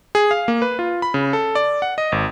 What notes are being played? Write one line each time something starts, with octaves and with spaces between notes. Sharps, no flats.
G#4
F5
A#3
B4
F4
B5
C#3
A4
D5
F#5
D#5
G#1